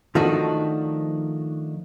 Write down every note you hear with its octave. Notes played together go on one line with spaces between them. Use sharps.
D#3 F3 A3 D4 D#4 F#4